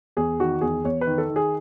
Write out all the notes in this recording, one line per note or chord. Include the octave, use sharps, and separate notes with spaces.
E2 G#4
D#3 F#4
E2 G#4
E2 C#5
B4
D#3
A4
D#3
G#4